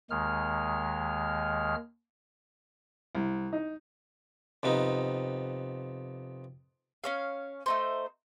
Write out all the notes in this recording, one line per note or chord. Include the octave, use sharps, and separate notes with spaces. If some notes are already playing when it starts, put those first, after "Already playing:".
D#2 D#3 G#3 F6
C2
D#4
F2 C3 B3 D#4
C#4 C#5 F5
A3 D#4 C5